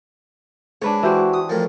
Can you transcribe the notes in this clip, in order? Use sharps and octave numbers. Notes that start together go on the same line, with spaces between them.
G#2 D4 B4 C#5
E3 F#4 G4 C5
D#6
F2 A2 A#4